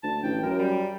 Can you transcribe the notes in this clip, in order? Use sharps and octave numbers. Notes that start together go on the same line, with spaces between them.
D2 A5
A1 G5
F#2 A#4
G3